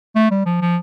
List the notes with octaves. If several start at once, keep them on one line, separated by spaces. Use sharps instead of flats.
A3
G3
F3
F3